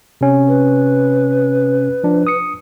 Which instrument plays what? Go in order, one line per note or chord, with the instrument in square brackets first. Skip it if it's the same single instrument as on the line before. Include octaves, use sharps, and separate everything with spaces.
[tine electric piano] C3 C#4
[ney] B4
[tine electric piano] F3 D4
D#6 C#7